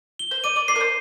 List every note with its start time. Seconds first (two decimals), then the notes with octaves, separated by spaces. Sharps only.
0.19 G7
0.31 C5
0.44 D5 D#7
0.56 D5
0.68 D5 C7
0.76 A#4
0.80 C5